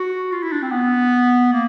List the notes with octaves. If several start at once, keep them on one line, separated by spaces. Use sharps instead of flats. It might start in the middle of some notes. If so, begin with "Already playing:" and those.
Already playing: F#4
F4
E4
D4
C4
B3
A#3